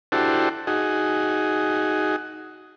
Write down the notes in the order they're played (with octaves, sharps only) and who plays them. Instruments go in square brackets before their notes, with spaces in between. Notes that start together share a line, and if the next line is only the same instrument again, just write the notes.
[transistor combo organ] D4 E4 F#4 G4 A4 C5
D#4 F#4 G#4